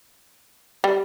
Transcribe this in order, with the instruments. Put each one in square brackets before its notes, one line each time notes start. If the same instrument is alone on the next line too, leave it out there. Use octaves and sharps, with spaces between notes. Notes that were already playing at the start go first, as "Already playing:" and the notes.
[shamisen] G3